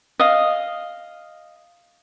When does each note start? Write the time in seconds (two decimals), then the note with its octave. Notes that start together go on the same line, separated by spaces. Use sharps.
0.19 D#5 F5